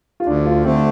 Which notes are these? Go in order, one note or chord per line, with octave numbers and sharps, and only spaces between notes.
F4
D2 D4
F4
D3 A3 C4